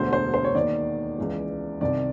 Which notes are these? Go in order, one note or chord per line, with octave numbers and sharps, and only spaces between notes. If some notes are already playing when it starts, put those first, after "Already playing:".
Already playing: E1 D2 D3 C5
C5
C5
C#5
D#2 D#3 D5
C#2 C#3 E3
C2 C3 D#3 D5